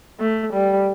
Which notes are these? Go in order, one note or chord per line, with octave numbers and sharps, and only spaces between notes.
A3
G3